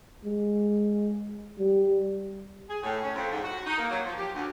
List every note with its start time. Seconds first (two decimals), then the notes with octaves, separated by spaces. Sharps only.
0.24 G#3
1.58 G3
2.70 G#4
2.83 A2
3.03 C#4
3.15 F2
3.32 G#2
3.44 F#4
3.66 D#4
3.79 A#3
3.91 F#3
4.06 F3
4.18 G4
4.35 D2